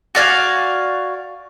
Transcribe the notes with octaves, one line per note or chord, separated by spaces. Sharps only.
F#4 D5 F5 G#5